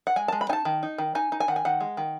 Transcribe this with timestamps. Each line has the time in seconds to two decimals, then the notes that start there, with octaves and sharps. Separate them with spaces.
0.07 F#5
0.16 G#3 G#5
0.28 G#3 A5
0.41 B5
0.49 D#4 G#5
0.53 A5
0.65 D#3
0.83 D#4
0.98 D#3
1.15 D#4 G#5
1.32 D#4
1.40 G#5
1.48 D#3 F#5
1.56 G#5
1.65 D#3 F#5
1.80 G#3
1.97 D#3